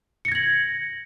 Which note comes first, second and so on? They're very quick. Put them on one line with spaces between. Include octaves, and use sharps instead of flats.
C#7 A#6 G#6 F#7